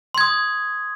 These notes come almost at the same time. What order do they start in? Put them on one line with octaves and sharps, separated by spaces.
C6 G#6 D#6